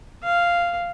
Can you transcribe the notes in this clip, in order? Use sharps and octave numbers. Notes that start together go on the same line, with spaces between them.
F5